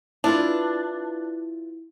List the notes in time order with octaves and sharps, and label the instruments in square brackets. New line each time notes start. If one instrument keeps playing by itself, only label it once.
[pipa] D4 [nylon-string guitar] E4 F4 B4